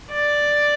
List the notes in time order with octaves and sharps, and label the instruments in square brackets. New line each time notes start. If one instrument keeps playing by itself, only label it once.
[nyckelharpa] D5